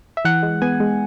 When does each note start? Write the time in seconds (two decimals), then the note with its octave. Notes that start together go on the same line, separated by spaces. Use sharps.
0.17 E5
0.25 E3 F#5
0.43 G#3
0.62 B3 G#5
0.80 G#3